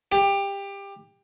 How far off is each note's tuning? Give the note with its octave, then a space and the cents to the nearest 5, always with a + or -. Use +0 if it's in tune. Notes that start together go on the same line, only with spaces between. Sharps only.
G4 +20